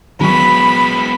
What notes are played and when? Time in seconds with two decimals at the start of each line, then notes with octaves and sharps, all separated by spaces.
0.21 F#3 G#3 B3 B5 C#6 B6